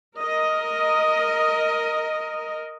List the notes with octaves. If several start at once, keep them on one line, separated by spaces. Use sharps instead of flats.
A#4 D#5